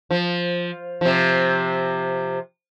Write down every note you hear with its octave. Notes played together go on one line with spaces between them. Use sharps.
F3
C3 F3